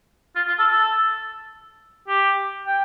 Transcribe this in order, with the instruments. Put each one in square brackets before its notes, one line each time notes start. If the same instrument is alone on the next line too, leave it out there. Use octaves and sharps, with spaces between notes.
[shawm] F4
F4
A4
A4
G4
G5